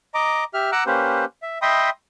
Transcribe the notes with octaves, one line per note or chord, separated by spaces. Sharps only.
D#5 A#5 D6
G4 E5 F6
F#5 A#5 D6 E6 F#6
A#3 C#4 G4 B4 C5
E5
D#5 E5 G5 B5 C6 D#6